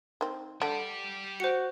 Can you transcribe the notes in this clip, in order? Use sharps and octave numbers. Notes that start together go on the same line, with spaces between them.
D#3 C4
D3 G4 D5
F#4 C5 C#7